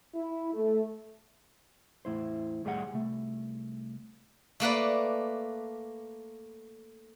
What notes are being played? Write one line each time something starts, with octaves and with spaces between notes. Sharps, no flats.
E4
A3
E2 A2 E4 C5
D#2 A2 G3 G#4 A#4 F#5
C2 A3
A3 A#3 B4 D5